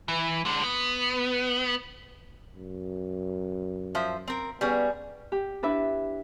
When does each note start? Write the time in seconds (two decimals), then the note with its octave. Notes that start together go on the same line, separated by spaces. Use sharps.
0.08 E3
0.45 D3 G#3
0.63 B3
2.53 F#2
3.95 F3 C5 E5
4.28 C4 A#4
4.61 G3 B3 C#4 G#4
5.32 G4
5.63 D4 E4 B4 E5